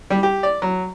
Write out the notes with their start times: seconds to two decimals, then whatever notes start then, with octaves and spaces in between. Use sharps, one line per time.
0.10 G3
0.23 G4
0.43 D5
0.62 F#3